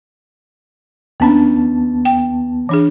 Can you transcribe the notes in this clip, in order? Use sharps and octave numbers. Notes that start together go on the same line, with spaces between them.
D#2 A#3 B3 C#4 D4 A5
G5
E3 D4 G#4